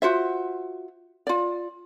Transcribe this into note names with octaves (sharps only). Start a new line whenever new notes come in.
F4 F#4 C5 E5
F4 D5